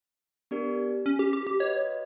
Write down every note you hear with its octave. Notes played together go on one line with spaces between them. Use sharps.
B3 D4 G4 A#4 D5
C#4
G4
G4
G4
F#4 B4 C#5 D#5